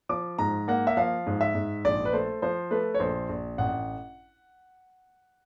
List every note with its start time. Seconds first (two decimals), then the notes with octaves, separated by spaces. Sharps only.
0.09 F3 D6
0.39 G#2 A#5
0.68 A#3 F#5
0.87 E5
0.97 F3 F5
1.27 G#2
1.41 E5
1.55 G#2
1.85 A#1 D5
2.05 B4
2.13 A3 C5
2.42 F3 C5
2.71 A3 B4
2.94 C#5
3.00 A#1 C5
3.29 A#1
3.58 A1 F#5